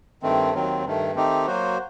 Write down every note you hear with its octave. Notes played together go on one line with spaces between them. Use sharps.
G2 D#3 A3 C4
D#2 D#3 F#3 C4
G2 D#3 A3
D#3 A3 C4 D#4 G4
F#3 A#3 F#4 C5